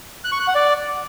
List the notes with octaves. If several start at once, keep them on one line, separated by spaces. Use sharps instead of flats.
F#6
C#6
F#6
F#5
D5